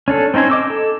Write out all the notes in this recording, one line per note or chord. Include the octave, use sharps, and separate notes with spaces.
C#4 D4 A4
C4 C#4 D#4 C5 G#5
D#5 D6 E6
A4